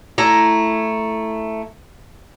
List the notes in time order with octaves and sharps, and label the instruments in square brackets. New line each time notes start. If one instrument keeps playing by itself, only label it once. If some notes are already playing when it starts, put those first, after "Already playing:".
[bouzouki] A3 E4 A#5